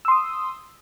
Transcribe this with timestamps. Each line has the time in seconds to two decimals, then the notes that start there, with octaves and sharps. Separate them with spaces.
0.05 E6
0.08 C6
0.11 D#6